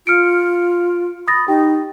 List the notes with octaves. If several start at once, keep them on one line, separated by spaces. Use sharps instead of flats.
F4 F6 C#7 D7
B5 D#6 A6 A#6
D#4 G4 G5